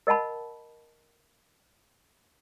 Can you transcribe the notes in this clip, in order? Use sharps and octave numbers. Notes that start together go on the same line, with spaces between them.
A#4 D#5 F#5 A5 B5